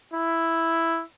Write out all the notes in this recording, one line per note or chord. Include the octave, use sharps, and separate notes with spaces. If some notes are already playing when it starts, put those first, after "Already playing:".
E4